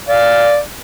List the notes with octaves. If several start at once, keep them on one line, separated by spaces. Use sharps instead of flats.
D5 F5